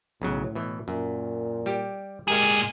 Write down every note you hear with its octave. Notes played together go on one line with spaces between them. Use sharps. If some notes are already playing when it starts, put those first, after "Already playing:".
B1 A2 C#3 F#3
B2 E3
F#2 A#2
G3 G4
A#2 G#3 G4 G#4 A#4 F5